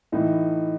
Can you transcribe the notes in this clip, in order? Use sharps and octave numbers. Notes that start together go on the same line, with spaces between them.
A2 E3 D#4